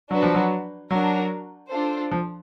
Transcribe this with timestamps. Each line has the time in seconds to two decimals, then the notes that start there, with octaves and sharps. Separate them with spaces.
0.11 F#3 D4 F#4 B4
0.23 F3
0.35 F#3
0.91 F#3 D4 F#4 A#4
1.71 D4 F4 A4 C5
2.11 F3